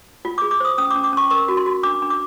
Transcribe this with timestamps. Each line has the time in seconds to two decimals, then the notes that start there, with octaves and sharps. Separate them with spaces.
0.25 F4
0.38 G#4 D6
0.51 D6
0.60 C5 D#6
0.78 C#4 D#6
0.91 D6
0.96 C#4
1.04 D6
1.13 C#4 C#6
1.30 A#4 C#6
1.48 F#4
1.57 C6
1.66 F#4
1.83 D4 D6
2.02 D4
2.10 D6